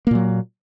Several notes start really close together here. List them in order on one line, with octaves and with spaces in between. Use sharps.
A#3 A#2 F#3